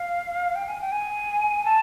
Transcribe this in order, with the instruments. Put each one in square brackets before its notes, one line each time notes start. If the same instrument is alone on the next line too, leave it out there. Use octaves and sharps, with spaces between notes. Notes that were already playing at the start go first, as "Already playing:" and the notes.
Already playing: [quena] F5
G5
G#5
G5
G#5
A5